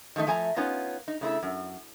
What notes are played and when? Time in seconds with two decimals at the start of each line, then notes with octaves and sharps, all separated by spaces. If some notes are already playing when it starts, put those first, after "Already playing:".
0.16 D#3 F3 A3 D#4
0.27 F3 A3 G#5 A#5
0.56 B3 C#4 D#4 F4
1.08 D#4
1.21 C#3 A3 E4
1.43 F#2